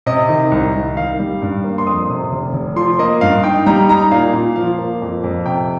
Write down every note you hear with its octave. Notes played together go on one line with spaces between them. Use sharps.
C3 D#5
D#3
C2
C2
D#3 F5
G3
G2
A#3
C6
F2 D#6
C3
F1
F1
F3 C6
A#3 D#5
G2 F5
D#4 G5
G3 A#5
D#4 A#5
A#2 F5
A#2
F3 F5
A#3
F2
F2
C3 G5